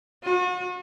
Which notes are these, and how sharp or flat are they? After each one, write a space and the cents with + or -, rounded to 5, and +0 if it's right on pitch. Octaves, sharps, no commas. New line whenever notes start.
F#4 -40